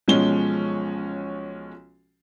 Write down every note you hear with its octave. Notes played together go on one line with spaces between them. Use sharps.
B1 F3 G#3 C#4 G7